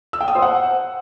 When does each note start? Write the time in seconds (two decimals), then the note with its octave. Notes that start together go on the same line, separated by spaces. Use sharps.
0.13 E6
0.20 G5
0.28 D#6
0.35 C5
0.42 F#5